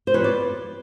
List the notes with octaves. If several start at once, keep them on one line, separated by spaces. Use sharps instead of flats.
C5
F2 B4 C#5
D5